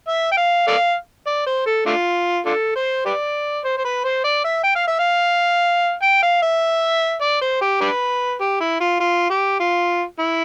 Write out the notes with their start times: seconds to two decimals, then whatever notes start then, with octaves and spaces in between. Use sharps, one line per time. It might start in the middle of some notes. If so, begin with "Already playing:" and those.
0.08 E5
0.32 G5
0.37 F5
0.67 A4 D5 F5
1.26 D5
1.46 C5
1.66 A4
1.86 A3 D4 F4
2.46 D4 F4 A4
2.76 C5
3.06 G4 B4 D5
3.64 C5
3.78 C5
3.84 B4
4.04 C5
4.24 D5
4.44 E5
4.64 G5
4.75 F5
4.87 E5
4.99 F5
6.02 G5
6.22 F5
6.42 E5
7.21 D5
7.41 C5
7.61 G4
7.81 D4 G4 B4
8.40 G4
8.60 E4
8.80 F4
9.00 F4
9.30 G4
9.60 F4
10.19 E4